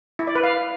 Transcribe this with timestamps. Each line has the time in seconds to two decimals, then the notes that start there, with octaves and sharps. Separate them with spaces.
0.19 E4
0.27 D5
0.35 B4
0.43 F5